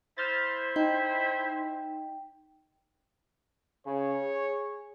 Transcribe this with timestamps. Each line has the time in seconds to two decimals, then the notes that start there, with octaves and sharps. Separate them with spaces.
0.18 E4 C5 F6 G6 A6
0.76 D#4 G5
3.86 C#3 C#5
4.23 G#4